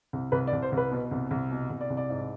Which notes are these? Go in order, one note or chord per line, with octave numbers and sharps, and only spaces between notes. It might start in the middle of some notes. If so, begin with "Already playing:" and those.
C2
C2 B4
D5
C2
C5
C2 B4
B2
C2
C2
B2
C2
D5
C2
D5
G#2